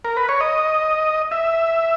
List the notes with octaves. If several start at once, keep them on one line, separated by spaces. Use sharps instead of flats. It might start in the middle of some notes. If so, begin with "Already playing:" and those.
A#4
B4
C#5
D#5
E5